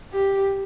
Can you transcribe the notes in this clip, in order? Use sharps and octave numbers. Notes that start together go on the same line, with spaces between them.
G4